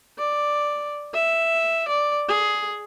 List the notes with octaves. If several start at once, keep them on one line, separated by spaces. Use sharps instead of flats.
D5
E5
D5
G#4